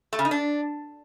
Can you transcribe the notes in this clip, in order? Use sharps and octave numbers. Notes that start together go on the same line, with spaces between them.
A3
C#3
D#4
D4